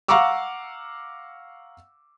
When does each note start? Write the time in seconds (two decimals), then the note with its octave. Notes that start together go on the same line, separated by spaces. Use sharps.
0.08 F5 F#5 A#5 C#6 D6 E6